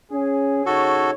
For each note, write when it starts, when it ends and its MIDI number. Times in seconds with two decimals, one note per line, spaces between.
0.12 0.63 61
0.12 0.63 68
0.66 1.12 49
0.66 1.12 63
0.66 1.11 66
0.66 1.11 69
0.66 1.12 73